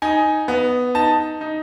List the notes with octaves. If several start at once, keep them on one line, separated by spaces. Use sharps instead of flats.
D#4 G#5
B3
D#4 A5
D#4